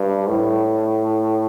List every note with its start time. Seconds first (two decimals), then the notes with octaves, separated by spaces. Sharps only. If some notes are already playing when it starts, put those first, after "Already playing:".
Already playing: G2
0.27 A2